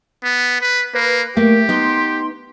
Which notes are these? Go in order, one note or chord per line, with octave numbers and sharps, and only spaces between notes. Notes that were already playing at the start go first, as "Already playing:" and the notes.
B3
B4
A#3 B4
A3 A#3 G4
B3 D#4 C6